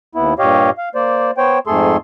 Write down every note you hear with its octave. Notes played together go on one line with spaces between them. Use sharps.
D#2 B3 E4
G2 A#2 G4 C#5 D#5 F5
F5
A#3 C5 D5
B3 C5 C#5 G5
F2 G#2 A3 G#4 A4 C6